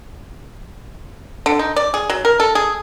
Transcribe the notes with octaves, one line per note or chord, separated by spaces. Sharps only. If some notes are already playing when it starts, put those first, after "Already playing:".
D3
D#4
D5
G#4
F#3
A#4
A4
G#4